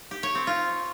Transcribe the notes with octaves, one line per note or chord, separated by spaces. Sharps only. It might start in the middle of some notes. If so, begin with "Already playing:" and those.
G4
C#5
C4
F4